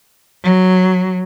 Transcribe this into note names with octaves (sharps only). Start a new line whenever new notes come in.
F#3